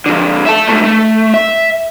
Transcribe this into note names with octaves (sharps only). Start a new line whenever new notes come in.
F2 D3
E5 A5
C#2 A3
A3
E5